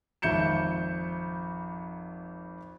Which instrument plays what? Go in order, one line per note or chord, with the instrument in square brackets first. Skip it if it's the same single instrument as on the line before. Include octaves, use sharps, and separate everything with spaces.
[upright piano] G#1 F2 E5 G6 C#7 E7